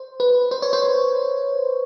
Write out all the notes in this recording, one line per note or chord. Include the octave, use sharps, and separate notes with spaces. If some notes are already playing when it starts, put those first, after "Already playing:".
Already playing: C5
B4
C5
C#5
C5